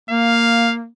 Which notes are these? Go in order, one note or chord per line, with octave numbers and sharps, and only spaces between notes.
A#3 F5